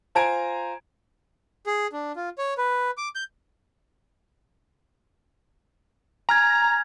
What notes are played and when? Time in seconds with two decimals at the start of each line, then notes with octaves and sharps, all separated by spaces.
0.15 F4 C5 G#5 A#5 G#6 D7
1.66 G#4
1.93 D4
2.16 F4
2.38 C#5
2.58 B4
2.97 D6
3.15 G6
6.29 G#5 A#5 F6 G#6